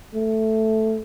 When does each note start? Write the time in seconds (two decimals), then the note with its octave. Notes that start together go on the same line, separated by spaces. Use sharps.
0.14 A3